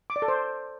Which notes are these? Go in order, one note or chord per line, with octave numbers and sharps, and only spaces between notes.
D6
D5
A4
C5